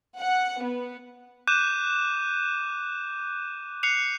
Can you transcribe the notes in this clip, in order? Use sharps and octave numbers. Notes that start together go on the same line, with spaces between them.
F#5
B3
D6 F#6 G6 D#7 E7
F#6 C7 C#7 F7